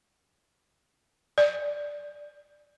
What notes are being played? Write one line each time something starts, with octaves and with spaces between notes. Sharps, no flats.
D5